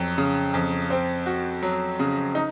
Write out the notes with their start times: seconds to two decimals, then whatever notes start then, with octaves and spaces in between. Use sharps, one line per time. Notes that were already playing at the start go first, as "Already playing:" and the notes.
Already playing: F2 F#3
0.18 C#3
0.54 F2
0.90 C4
1.26 F#4
1.63 F#3
2.00 C#3
2.35 D#4